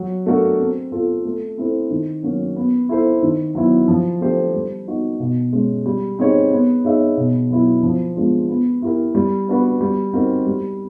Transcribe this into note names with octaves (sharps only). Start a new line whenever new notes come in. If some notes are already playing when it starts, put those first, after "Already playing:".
Already playing: F#3
A3 D4 F#4 A#4
C4
F4 A4
A3
C4 E4 A4 C5
D#3
F#3 A#3 C#4
B3
E4 A4 C5
D#3
F#3 B3 E4
F3
A3 D4 G4 C5
G3
B3 D#4 F#4
B2
G#3 C#4
G3
C4 D#4 G#4 C#5
B3
D#4 G#4 C#5 E5
B2
F#3 B3 E4
F3
G#3 B3 D4 F4
B3
E4 G4 A#4
G3
B3 D4 F#4 B4
G3
C4 D#4 F#4 A#4
G3